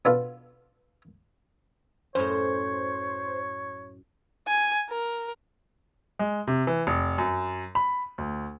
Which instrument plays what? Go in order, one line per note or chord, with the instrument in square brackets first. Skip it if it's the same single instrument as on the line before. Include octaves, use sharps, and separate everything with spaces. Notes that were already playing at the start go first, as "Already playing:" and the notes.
[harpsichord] B2 B3 D4 F4 A4 F5
[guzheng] F#2 A2 [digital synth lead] C5 [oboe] C#5
[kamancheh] G#5
A#4
[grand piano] G#3
C3
E3
F1
F#2
B5
D2